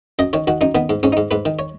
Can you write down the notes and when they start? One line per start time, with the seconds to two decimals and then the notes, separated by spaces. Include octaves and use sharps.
0.19 F#2 D#5
0.33 D#3 C#5
0.47 D#3 F#4
0.61 F#2 D#4
0.75 D#3 B3
0.90 G#2
1.03 G#2 C#4
1.12 D#4
1.17 G#2
1.31 G#2 B4
1.45 D#3
1.59 C#5